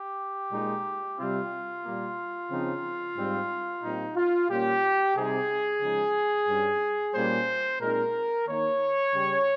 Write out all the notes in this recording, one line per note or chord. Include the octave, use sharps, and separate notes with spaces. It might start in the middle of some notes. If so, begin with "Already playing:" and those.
Already playing: G4
A#2 G#3 D#4
C3 G3 C4 F4
A#2 G3 A#3
C#3 F3 C4 D#4
G#2 G3 C4
A#2 G3 C4 D#4
F4
A#2 G3 A#3 C#4 G4
C3 G3 C4 D#4 G#4
C#3 F3 G#3 D#4
G2 G3 C#4
A#2 G3 A#3 C#4 C5
A#2 G#3 C4 D#4 A#4
D#3 A#3 D#4 C#5
C#3 G3 C#4